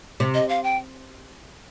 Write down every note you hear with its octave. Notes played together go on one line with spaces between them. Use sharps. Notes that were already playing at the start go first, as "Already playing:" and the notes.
C3
D#5
F5
G5